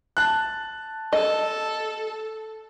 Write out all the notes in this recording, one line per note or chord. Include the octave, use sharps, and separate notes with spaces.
A5 F#6
A4 D#5